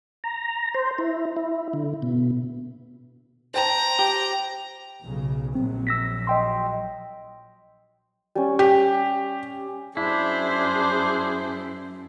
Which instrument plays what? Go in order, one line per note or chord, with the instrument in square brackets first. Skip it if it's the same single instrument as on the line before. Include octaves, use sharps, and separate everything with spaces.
[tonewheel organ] A#5
C5
E4
E4
D3
B2
[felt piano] C5 G5 A5 [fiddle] A#5
[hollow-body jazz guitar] G4
[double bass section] B1 C#3
[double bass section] A#1 F#3 [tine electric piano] C4
[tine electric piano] E6 A#6 B6
D#5 G5 C6
[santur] G3 C#4
[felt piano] G4
[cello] F#2 [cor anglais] D4 [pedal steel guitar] E4 [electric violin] G#4 C5